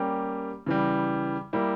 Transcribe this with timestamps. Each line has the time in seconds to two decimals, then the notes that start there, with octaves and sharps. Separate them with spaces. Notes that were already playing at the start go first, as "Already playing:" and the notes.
Already playing: G3 A#3 C#4 G4
0.66 C#3 E3 G3
1.53 G3 A#3 E4